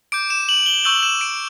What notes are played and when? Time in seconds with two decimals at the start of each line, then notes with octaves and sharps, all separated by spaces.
0.12 D6 G6 D7
0.30 E7
0.49 F#7
0.66 G7
0.85 C#6 E6 G6 F#7
1.03 E7
1.21 D7